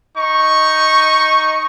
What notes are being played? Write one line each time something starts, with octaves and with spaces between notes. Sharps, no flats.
D#4 C#6